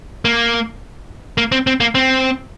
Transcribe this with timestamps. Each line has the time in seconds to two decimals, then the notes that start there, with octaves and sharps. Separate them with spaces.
0.25 A#3
1.38 A#3
1.52 C4
1.67 C4
1.80 A#3
1.95 C4